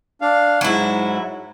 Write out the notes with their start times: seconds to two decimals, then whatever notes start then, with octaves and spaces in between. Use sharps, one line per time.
0.21 D4 F5
0.61 G#2 F#3 E4